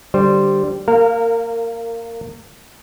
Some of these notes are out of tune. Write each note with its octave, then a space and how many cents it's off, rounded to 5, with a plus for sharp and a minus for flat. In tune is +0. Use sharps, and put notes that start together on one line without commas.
D3 +0 G3 -10 C5 +0
A#3 -20 A#4 -30 F5 +10